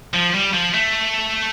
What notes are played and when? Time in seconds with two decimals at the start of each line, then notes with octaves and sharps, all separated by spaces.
0.13 F3
0.34 G3
0.54 F3
0.74 A3